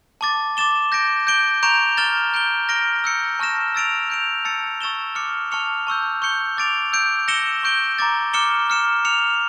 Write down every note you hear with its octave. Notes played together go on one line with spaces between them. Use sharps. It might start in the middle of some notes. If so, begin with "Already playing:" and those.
A5 D6 A6
D6 A6 E7 G7
G6 A#6 D7
G6 D7 G7
A#5 C#6 G6 D7 F7
F6 A6 E7 G7
G6 D7 G7
F6 A#6 D7 G7
E6 G6 C#7
A5 C#6 F6 A#6 E7
E6 A6 D7 F7
G6 D7 F7
A5 E6 A6 C#7
C#6 E6 A6 E7 G7
D6 F6 C#7
A5 C#6 F6 C#7 F7
A5 C#6 E6 G6
C#6 G6 C#7 G7
D6 A6 D7 F7
E6 G6 D7
E6 A#6 C#7 E7 G7
C#6 G6 D7 G7
A#5 D6 A6
D6 F6 C#7 E7 G7
F6 C#7 E7
F6 C#7 F7